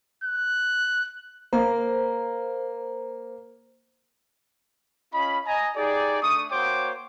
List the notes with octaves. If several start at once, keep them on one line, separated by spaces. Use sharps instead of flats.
F#6
A#3 C5
C#4 F4 D#5 B5
D#5 G#5 A#5
D#4 G4 G#4 D5
A3 D4 C#6 D#6
A#3 F#4 C5 C#5 G5 D6